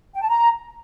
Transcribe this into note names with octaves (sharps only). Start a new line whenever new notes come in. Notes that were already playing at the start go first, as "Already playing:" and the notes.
G5
A5
A#5